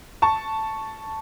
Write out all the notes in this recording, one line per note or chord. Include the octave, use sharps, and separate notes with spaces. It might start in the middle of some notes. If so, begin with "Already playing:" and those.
A5 C#6